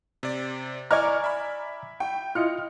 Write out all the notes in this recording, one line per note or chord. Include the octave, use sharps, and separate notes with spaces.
C3 D5
E4 D5 G#5 A#5 C#6 D6 F6 G#6
E5 B5
G5
E4 F4 D#5 F6 C#7